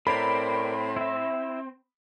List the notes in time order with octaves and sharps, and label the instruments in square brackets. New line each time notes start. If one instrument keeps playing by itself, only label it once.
[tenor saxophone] A2 [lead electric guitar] C4 [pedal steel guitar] A#4 D5 A#5 [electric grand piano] B5
[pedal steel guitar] E4 E5